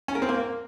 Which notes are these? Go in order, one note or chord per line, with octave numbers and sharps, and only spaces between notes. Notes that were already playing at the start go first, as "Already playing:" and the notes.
C#4
A#4
C4
A#3